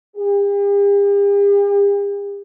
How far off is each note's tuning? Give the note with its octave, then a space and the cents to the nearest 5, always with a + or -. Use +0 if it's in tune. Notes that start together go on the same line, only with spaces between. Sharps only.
G4 +45